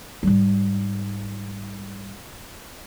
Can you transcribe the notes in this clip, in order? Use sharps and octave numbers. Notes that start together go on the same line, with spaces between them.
G#2 G3